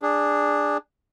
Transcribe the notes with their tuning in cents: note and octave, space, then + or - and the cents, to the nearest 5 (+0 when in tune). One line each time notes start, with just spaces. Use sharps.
D4 +0 G#4 -15